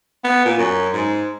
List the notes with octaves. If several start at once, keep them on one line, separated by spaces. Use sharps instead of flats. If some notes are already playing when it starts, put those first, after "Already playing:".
B3
A#2
F#2
G#2